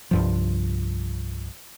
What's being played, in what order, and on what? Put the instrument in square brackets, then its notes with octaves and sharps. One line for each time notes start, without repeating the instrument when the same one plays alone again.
[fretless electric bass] C2 G2 F3